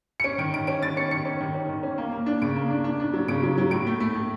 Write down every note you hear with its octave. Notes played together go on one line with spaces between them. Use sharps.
C#7
C#4 D7
D#3 D7
D#3 D7
C#4 D7
D#3 A6
C#4 C#7
D#3 C#7
C#4
D#3
C#4
D#3
C#4
A#3
A#3
D4
C#3 D7
A#3
D4
D4
D4
F#3
C#3 D7
F#3
F#3
A2 D7
A3
A3
A3